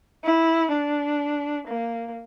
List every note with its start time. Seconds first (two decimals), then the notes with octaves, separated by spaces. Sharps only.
0.24 E4
0.72 D4
1.68 A#3